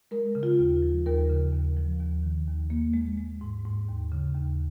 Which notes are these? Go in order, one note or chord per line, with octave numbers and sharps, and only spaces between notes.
G#3 A#4
C#3
F4
D#2
F3
D#2 A#4
C#3
D#2
F3
D#2
D#3
D#2
A#3
G#3
G#3
G#2
G#2
D#2
C#3
D#2